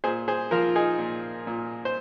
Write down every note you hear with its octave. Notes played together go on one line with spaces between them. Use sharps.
A#2 G#4 C5
G#4 C5
F3 F4 A#4
D#4 G#4
A#2
A#2
C5